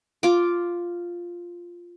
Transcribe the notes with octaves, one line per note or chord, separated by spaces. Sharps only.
F4 D6